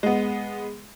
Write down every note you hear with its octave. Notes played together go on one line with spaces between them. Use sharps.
G#3 B3